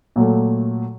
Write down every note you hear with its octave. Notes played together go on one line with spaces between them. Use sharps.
A#2 F#3 A3